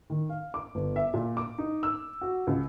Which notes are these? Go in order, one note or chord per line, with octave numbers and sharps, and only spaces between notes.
D#3
F5
D6
G1
E5
A#2
D6
D#4
E6
F#4
C#2